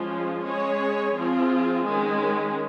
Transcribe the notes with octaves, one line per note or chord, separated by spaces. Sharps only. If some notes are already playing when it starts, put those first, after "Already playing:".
Already playing: F3 G#3 C#4 F4
G#3 C#4 G#4 C#5
F3 C4 F4 G#4
D#3 G#3 C#4